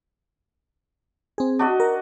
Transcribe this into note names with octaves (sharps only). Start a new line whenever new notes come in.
C4 G#4
D4 F#4 D#5
A#4